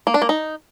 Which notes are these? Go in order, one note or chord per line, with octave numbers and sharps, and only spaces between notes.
A#3
D4
A#3
D#4